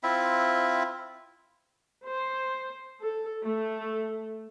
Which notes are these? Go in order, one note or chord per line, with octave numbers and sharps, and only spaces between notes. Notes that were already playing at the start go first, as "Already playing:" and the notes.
C4 E4 F4 E5
C5
A4
A3